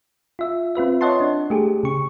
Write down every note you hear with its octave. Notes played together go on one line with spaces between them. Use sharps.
F4 E5
C4 F4 B4 E5
C#5 D#5 F#5 A5 C6
D4
A3 G4 G#4
C#3 C#6